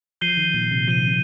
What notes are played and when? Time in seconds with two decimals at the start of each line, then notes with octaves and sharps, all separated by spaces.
0.21 F3 G6 C7 D#7 G7
0.37 D#3
0.54 A#2
0.71 C3
0.88 F3 G6 C7 D#7 G7
0.97 D#3
1.07 C3